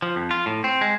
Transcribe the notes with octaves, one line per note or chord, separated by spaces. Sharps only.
F3
F2
F4
A2
C4
G#3